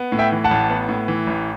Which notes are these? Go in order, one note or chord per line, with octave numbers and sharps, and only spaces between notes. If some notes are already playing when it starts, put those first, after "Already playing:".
Already playing: B3
A2
E5 G5
E3
F#5 A5
A1
B3
A2
E3
A1